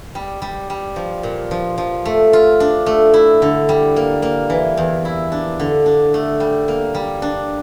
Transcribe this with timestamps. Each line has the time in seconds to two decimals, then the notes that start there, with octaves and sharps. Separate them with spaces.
0.15 G3
0.42 G3
0.70 G3
0.96 F3
1.23 A#2
1.51 F3
1.78 F3
2.05 A3
2.33 F4
2.60 D4
2.86 A3
3.14 E4
3.42 D3
3.69 G3
3.96 A#3
4.22 A#3
4.50 E3
4.77 E2
5.05 E4
5.32 D4
5.60 D3
5.86 D4
6.14 A3
6.40 G3
6.68 A#3
6.95 G3
7.22 D4